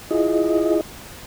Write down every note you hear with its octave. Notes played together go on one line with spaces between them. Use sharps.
E4 F4 G#4 D#5